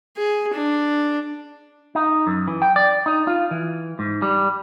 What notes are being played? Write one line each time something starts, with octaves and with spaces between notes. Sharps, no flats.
G#4
D4
D#4
F#2
E3
G5
D5
D#4
F4
E3
G#2
G3